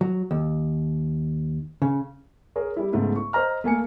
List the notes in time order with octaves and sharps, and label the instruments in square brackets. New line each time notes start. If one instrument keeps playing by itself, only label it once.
[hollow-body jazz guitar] F#3
D#2
C#3
[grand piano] G#4 A#4 C#5
G3 E4
G#2 C#3 A3 B3 E4
C#6
C5 D#5 A#5 F6
A3 A#3 G#5 C#7